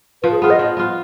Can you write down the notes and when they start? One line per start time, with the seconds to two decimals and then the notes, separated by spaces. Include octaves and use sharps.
0.22 F3 B4
0.31 G#4
0.42 B3 F4 G#4
0.50 D#5
0.59 F3
0.77 B3 F4